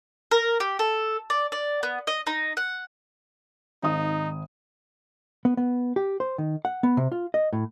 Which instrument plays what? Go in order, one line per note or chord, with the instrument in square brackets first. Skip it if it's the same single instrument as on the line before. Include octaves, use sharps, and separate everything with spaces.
[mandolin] A#4
G4
A4
D5
D5
B3
D#5
D#4
F#5
[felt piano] G#1 D#6 [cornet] D#4
[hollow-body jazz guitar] B3
B3
G4
C5
D#3
F#5
B3
C3
F4
D#5
A2